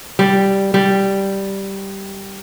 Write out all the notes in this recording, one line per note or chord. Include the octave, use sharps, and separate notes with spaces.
G3
G3